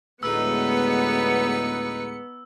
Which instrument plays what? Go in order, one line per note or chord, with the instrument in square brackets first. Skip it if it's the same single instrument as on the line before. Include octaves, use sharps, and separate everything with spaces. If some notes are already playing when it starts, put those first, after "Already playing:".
[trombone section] D2 A2 G#3 [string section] B3 C#7 [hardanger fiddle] D#4 B4 [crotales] E6